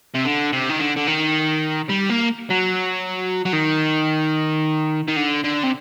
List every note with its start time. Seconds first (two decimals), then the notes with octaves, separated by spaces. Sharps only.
0.15 C3
0.25 D3
0.53 C3
0.69 D#3
0.80 D3
0.97 D3
1.07 D#3
1.89 G3
2.10 A#3
2.50 F#3
3.45 F#3
3.53 D#3
5.08 D#3
5.16 D3
5.44 D3
5.64 C3